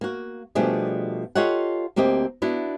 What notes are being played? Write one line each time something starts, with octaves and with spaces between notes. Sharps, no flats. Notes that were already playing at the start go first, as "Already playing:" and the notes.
A#3 F#4
B2 F3 G3 A3 D4 G#4
F4 G4 A4 C#5 D#5 F#5
D2 A#3 C4 G4 D#5
B3 D4 E4 F#4